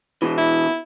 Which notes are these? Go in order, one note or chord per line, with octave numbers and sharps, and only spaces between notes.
B2 E3
E4